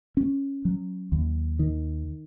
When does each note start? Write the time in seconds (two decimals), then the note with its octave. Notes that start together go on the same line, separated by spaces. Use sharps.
0.17 C#4
0.65 F#3
1.12 D#2
1.59 D#3